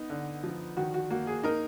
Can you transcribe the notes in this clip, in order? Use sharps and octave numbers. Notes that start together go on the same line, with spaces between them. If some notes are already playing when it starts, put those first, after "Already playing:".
Already playing: B3 D#4
D3
F3
D#3 F#4
F#4
A#3 F#4
G#4
D#4 A#4